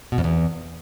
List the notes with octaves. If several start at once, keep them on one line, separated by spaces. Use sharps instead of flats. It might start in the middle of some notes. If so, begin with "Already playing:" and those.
B2
F2
E2